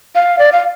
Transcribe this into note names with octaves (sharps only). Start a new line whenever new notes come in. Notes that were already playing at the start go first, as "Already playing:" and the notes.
F5
D5
F5